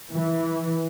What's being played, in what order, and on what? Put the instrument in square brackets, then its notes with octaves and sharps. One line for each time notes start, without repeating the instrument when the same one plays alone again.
[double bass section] E3